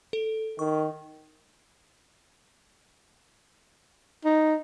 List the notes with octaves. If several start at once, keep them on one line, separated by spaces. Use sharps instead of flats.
A4
D#3 C#6
D#4